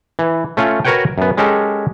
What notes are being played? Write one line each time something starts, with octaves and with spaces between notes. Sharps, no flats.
E3
A3 C#4 F4
F#4 A#4 B4 C#5 F#5 G5
F#2 B3
G#3 C#4 G4 A4 A#4